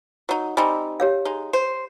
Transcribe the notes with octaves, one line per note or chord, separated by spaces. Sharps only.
F#3 D#4
G3 C4 D#4 G#5
G4 C#5 F5
G#3 D#4
C5